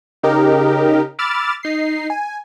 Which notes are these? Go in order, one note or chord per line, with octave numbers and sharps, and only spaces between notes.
C#3 D#4 G4 A#4
B5 D6 E6 F6 A6
D#4 C7
G#5